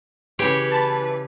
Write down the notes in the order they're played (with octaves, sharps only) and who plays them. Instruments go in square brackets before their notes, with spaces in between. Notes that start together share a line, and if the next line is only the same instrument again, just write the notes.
[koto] C#3 G4 C#5 [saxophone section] E3 B4
[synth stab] A5 B5